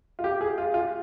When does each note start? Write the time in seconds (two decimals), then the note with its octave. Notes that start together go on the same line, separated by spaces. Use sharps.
0.19 F4
0.24 G4
0.41 G#4
0.58 F4
0.74 F4